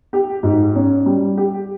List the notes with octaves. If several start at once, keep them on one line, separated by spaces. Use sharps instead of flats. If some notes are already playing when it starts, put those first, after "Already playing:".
G4
G#2
C#4
G3
G4